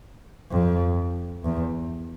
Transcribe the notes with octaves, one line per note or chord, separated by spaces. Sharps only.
F2
E2